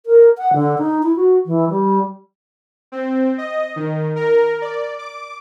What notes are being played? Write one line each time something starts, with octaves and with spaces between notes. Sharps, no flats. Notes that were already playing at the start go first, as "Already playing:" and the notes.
A#4
F#5
D3
D#4
E4
F#4
E3
G3
C4
D#5
D#3
A#4
D5
D6